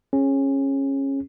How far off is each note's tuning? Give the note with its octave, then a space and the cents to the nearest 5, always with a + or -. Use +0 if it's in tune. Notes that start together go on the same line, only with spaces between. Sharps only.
C#4 -20 G#4 +0